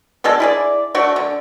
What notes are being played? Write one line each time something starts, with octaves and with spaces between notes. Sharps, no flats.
B2 D3 G#3 A4
E4 G#4 D5
A3 D4 F#4
D3